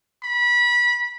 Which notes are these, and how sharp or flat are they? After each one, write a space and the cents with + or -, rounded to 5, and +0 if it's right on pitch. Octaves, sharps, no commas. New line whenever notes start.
B5 -25